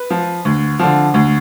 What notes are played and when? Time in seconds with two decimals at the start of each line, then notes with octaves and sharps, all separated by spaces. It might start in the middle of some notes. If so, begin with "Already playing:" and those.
Already playing: B4
0.10 F3
0.45 D2
0.79 D3 F3
1.14 D2